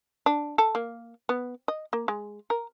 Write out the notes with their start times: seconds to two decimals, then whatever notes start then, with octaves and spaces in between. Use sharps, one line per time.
0.26 D4
0.58 A4
0.75 A#3
1.29 B3
1.68 D#5
1.93 A#3
2.08 G#3
2.50 A#4